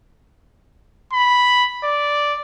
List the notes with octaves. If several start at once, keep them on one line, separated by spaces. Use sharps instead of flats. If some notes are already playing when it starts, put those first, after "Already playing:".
B5
D5